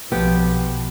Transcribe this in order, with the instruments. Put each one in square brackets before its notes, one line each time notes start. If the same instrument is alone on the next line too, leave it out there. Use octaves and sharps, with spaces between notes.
[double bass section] B1 F3 [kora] B3 G4 B4